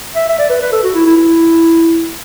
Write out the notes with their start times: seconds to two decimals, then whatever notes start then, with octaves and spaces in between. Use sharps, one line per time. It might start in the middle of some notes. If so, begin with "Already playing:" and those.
0.15 E5
0.29 E5
0.39 D5
0.49 B4
0.61 B4
0.72 A4
0.83 F#4
0.95 E4
1.06 E4
1.17 E4